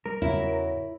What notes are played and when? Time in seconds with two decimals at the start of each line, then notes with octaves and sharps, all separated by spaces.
0.06 G3 A#4
0.22 E2 G#2 C#3 F#3 E4